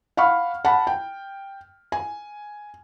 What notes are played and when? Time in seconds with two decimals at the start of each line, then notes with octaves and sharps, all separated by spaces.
0.17 F5 F#5 B5 C#6 F6
0.65 F#5 A5 B5
0.87 G5
1.92 G#5